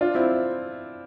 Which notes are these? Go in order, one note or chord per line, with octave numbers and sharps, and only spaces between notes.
D4 F4
C4 E4